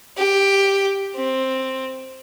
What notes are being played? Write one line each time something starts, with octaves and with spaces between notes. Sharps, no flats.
G4
C4